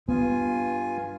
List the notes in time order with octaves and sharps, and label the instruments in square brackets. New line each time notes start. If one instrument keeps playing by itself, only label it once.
[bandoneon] G2 F4 G#5 [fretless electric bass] B3